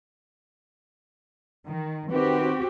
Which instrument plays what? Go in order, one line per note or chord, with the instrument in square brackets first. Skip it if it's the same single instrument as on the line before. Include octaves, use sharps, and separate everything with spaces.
[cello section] D#3
[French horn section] D#3 B4 [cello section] C4 F#4 G4